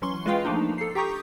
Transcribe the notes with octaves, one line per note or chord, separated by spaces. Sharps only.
E3 F#3 C#4 C6 C#6 G7
G#3 F4 B4 D#5 F5 G5
F3 A3 A#3 D4 D#4
A4 C7
G4 G5 A#5 C#6 D#6 G6